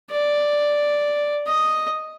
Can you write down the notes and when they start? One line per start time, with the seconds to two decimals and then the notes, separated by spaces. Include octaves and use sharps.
0.10 D5
1.47 D#5